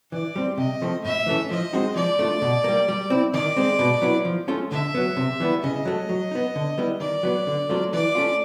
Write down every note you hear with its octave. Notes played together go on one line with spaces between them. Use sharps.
E3 D5
G3 C4
C3 D#5
F3 A3 C4
A2 E5
E3 A3 C#4
F3 D#5
G#3 C4 D#4 F#4
F3 D5
A3 D4 F4
B2
G3 A#3
G3
C4 E4
D#3 D5
G#3 C4
B2
F#3 B3 E4
F3
A3 C#4 F4
D3 E5
F#3 B3
C3
E3 G3 B3 E4
C#3 D#5
F#3 A3
F#3
B3 D#4
D3
G3 B3 E4
D#3 D5
F#3 B3
D3
F#3 A3 C4 F4
E3 D5
A3 C#4 F4